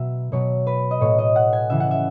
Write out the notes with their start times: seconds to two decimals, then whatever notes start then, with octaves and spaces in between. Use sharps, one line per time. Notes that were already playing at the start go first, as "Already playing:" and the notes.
Already playing: B2 F#3 E5
0.32 B2 F#3 C#5
0.67 B4
0.91 D#5
1.01 A2 F#3 C#5
1.19 D#5
1.36 F#5
1.53 G#5
1.70 C#3 E3 E5
1.80 F#5
1.91 E5